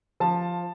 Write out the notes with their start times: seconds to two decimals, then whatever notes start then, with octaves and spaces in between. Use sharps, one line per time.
0.20 F3 A5